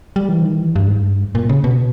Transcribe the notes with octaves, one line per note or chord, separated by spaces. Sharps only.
G3
E3
D#3
E3
G2
G#2
G2
A#2
C#3
B2